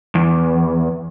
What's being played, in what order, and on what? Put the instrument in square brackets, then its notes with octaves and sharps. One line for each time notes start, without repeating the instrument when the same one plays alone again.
[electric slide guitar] E2